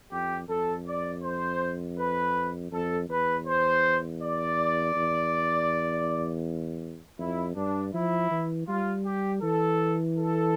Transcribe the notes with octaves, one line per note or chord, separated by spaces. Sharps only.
F2 G4
F2 A4
D5
C5
B4
F2 A4
E2 B4
C5
D5
E2
F2 E4
G2 D4
F3 E4
E3
G3 F4
G4
E3 A4
A4